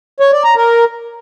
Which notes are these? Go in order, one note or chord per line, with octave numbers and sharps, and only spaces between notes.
C#5
D5
A#5
A#4